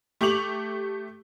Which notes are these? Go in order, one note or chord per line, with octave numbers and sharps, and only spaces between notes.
A3 G4 C#6 D6 F7 F#7